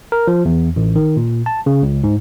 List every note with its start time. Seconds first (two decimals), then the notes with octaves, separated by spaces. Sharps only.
0.12 A#4
0.27 F3
0.45 E2
0.76 A1
0.96 D#3
1.17 A#2
1.46 A5
1.66 C#3
1.83 C#2
2.04 G#2